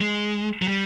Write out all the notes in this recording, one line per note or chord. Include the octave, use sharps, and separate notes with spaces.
G#3
F#3
G3